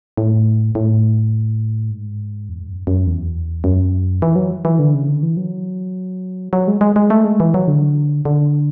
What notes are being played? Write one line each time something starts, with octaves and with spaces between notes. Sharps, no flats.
A2
A2
G#2
E2
G#2
F#2
F#2
E2
F#2
E3
F#3
E3
D3
C#3
D3
E3
F#3
F#3
G#3
G#3
G#3
A3
G#3
E3
F#3
D3
D3